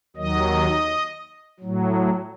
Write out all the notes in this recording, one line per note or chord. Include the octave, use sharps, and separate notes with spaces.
D#2 D#3 F#3 D#5
A2 F#3